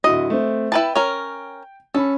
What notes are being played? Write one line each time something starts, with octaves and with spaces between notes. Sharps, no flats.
D1 E4 F#4 D#5
A3 C4
E4 B4 G5 A5
C#4 A#4
C#4 A4 B5